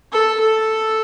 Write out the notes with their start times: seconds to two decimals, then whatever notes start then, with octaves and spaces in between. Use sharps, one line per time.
0.12 A4
0.40 A4